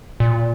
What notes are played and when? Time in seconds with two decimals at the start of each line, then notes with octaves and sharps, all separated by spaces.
0.20 A#2